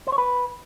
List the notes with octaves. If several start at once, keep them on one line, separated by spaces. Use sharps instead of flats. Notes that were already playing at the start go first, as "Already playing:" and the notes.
C5
C#5
B4